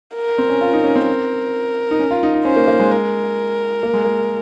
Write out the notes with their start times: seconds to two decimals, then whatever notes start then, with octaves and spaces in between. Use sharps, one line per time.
0.16 A#4
0.38 C4
0.50 C#4
0.61 F4
0.73 D#4
0.84 C#4
0.96 C4
1.07 A#4
1.91 D#4
1.99 C#4
2.11 F4
2.23 D#4
2.34 D#4
2.45 C#4 C5
2.56 A#3
2.68 A#3
2.80 G#3
2.91 A#4
3.83 A#3
3.93 G#3
4.04 A#3